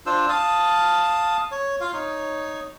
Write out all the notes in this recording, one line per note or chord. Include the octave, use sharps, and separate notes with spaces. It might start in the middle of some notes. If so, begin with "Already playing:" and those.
D4 F4 C5 E6
F5 A5 D#6
C#5
F4 F5
D#4 C#5